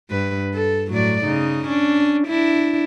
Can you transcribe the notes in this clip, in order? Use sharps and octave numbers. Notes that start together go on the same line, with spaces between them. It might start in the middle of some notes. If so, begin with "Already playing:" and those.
G2 B4
A4
A2 F#3 D5
C#3 D#4
C#4 D4
D4 E4